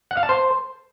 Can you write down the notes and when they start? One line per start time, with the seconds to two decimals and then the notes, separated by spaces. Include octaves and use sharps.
0.11 F#5
0.17 F5
0.23 A5
0.29 C5